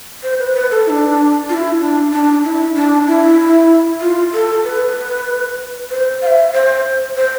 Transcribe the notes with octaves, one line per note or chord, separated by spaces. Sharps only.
C5
B4
B4
A4
E4
D4
F4
E4
D4
D4
E4
D4
E4
F4
A4
B4
C5
F5
E5
C5
C5